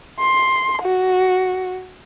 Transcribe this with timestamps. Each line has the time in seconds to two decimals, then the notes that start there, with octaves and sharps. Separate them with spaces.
0.20 C6
0.82 F#4